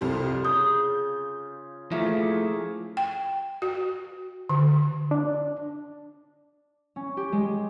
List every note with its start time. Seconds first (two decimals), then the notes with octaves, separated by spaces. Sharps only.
0.01 C2 F2 G3 F4 C5
0.45 C#3 D#6 G6
1.92 F3 A3 A#3 E4 G#4
2.97 G5
3.62 F#4
4.49 D3
5.11 D4
6.96 C#4
7.17 G4
7.33 G#3